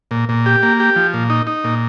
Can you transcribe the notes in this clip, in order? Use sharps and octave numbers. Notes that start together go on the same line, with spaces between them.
A#2
A#2
G4
A#3
G4
F3
A#2
D#4
D#4
A#2